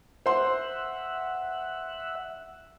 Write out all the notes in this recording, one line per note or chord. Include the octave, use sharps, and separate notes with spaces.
C5 E5 F#5 C6